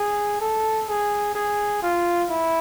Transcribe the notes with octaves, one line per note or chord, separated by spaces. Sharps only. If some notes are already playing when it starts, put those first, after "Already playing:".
Already playing: G#4
A4
G#4
G#4
F4
E4